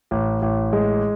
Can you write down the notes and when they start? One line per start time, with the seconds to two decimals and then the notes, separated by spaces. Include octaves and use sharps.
0.11 A1
0.42 A1
0.73 G#3